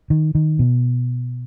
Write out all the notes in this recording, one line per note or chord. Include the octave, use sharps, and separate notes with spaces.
D#3
D#3
B2